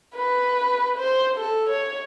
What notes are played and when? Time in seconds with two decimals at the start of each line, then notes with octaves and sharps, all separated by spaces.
0.15 B4
0.98 C5
1.36 A4
1.69 C#5